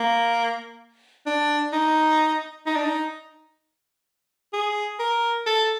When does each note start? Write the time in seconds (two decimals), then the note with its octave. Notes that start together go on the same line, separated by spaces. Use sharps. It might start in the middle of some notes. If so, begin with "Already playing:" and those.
Already playing: A#3
1.26 D4
1.73 D#4
2.66 D#4
2.76 D4
2.85 D#4
4.53 G#4
4.99 A#4
5.46 A4